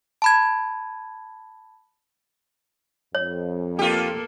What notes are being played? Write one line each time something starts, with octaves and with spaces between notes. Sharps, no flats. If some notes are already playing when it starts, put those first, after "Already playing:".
A5 B5 G#6
F2 C#5
A#3 F4 G4 A4